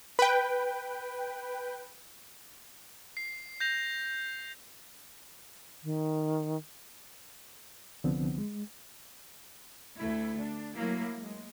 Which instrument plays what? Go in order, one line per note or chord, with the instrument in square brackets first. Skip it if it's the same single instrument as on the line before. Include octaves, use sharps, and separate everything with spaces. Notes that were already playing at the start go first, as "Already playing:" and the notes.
[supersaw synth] B4 G5
[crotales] C7
G6 A#6 F7
[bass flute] D#3
[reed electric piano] C2 D3 F3 B3 C4
G#3
[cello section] D2 A3 E4
D4
F#3 A3 A#3 E4
G#3